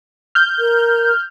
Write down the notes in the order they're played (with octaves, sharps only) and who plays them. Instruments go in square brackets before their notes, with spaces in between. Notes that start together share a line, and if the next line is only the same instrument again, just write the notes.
[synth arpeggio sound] F6 G6
[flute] A#4